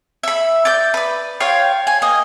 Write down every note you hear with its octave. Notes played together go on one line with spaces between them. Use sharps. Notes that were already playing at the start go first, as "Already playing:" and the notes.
E5 B5
D5 G6
B4 D5
F4 C#5 F5 G5
G#5
A#3 D#5